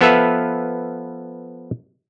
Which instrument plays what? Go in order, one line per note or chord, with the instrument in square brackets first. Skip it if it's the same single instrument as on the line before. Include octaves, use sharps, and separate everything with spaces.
[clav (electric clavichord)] F3 B3 A4 B4 E5 F5